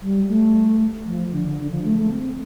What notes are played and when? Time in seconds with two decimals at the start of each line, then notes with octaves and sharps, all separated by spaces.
0.02 G3
0.28 A3
1.06 F3
1.32 D3
1.58 D3
1.71 F3
1.84 A3
1.97 A3
2.10 C4